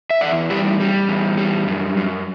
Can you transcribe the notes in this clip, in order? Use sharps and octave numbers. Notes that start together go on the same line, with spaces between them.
E5
E2 D5 F#5
G3 E4 G4
G3
E2
G3
F#2
F#2